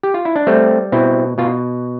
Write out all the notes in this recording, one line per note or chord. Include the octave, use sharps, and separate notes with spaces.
G4
F4
E4
D4
G3 A3 C4
B2 C4 E4
B2 F4